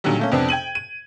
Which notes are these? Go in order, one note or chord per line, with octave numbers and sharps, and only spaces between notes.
A#2 D3 D#3 F#3 G3
A3 A#3 C#4
F2 C3 B3 D4
G5 G#6 D#7 F#7
D#7